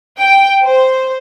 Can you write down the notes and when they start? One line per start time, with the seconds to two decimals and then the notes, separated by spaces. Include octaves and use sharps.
0.19 G5
0.64 C5